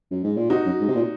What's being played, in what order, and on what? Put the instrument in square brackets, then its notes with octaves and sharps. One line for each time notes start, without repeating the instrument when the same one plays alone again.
[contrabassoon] F#2
G#2
A#2
[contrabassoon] C3 [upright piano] D#4 F#4
[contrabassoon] F#2
G#2
C3
A#2